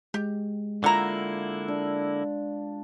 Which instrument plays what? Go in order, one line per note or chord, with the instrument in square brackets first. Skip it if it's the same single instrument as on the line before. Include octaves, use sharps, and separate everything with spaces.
[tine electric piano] G#3 [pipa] G4
[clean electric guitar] D3 A#3 E4 [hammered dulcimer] F4 [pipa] F#5 A#5
[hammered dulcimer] D4